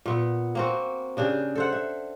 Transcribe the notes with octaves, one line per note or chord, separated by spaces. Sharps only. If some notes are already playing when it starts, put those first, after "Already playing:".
A#2 B3
A#3 C4 F#4
C#3 D4 G4 G#4
A4 C5 F#5
E5